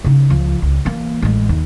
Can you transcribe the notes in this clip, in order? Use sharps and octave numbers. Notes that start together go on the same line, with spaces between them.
C#3 D#4
C#2 F3
C#2
E3 A#3
A1 G#3
D#2